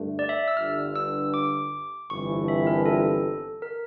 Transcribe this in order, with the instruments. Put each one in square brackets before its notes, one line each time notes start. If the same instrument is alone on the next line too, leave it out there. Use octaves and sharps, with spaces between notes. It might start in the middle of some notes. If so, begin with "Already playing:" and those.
Already playing: [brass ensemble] G2 D3 A3
[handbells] D5
E5
E6
[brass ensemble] G1 G2 D3 [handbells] F6
[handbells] E6
D6
[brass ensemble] G1 F2 E3 [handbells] C#6
[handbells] E5
A#4
A4
A#4